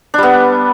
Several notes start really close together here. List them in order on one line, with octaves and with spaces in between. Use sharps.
D4 G3 B3